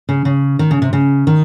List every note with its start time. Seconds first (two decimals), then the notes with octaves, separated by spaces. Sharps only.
0.09 C#3
0.25 C#3
0.59 D#3
0.71 C#3
0.82 C3
0.93 C#3
1.27 D#3